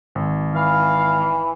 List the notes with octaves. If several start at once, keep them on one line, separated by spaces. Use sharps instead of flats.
G#1
E3 F5